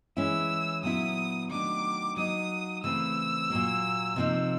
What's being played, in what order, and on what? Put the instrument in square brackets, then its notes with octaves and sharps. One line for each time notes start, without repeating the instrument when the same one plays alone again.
[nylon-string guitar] E3 G#3 C#4 E4 [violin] E6
[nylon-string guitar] A#2 F#3 B3 E4 [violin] D#6
[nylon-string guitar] D#3 F#3 A3 D4 [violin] D6
[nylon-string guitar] F#3 A#3 D#4 [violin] D#6
[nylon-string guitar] C#3 E3 A3 C4 [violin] E6
[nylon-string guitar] A#2 F#3 A#3
C3 F3 A#3 D#4